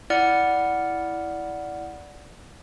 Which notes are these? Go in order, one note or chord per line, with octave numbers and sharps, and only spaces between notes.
E4 D5 F#5 F6 C#7